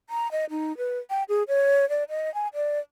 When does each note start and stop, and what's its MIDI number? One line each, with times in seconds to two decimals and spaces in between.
0.10 0.30 82
0.32 0.45 75
0.50 0.76 63
0.77 0.98 71
1.10 1.23 79
1.29 1.43 68
1.48 1.88 73
1.89 2.04 74
2.09 2.32 75
2.34 2.48 80
2.54 2.79 74